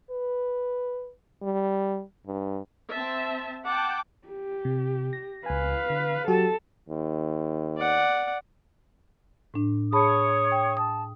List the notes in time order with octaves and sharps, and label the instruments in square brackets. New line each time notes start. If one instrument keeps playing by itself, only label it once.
[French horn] B4
G3
G2
[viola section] C4 E5 A5
[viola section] F#5 G5 A5 [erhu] D6
[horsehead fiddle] G4
[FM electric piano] C3
A#6
[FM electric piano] C#2 G#5 [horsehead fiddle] B4 F5
[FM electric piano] D3
[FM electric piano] F#3 F#4 G4 [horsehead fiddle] A4 A5
[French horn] D#2
[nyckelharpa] D5 F#5
[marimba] A2 D4
[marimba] G#4 A5 B5 [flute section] C#5 C#6 D#6
[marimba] G5
[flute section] A5 [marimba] D#6